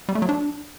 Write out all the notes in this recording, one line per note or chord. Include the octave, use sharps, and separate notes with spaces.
G3
A3
F#3
D4